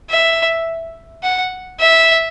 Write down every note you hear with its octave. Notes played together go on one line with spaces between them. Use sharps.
E5
F#5
E5